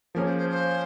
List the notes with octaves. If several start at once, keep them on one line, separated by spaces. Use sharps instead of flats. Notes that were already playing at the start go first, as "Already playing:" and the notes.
F3 A#3 C#4 G#4 A#4
C5
C5
C5